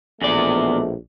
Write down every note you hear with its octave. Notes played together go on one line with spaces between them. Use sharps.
A#1 E2 B2 A3 D5